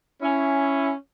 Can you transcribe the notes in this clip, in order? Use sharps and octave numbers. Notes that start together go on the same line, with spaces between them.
C#4 E4